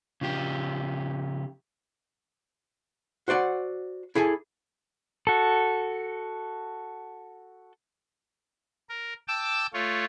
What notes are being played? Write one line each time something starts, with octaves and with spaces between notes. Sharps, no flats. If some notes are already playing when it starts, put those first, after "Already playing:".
C#3 F3 G4
F#4 C5 D5 F#5
E4 G#4 A4 G#5
F#4 A4
A#4
G5 A5 D6 E6
A3 F4 C#5